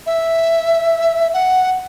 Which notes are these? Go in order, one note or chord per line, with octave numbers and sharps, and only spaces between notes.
E5
F#5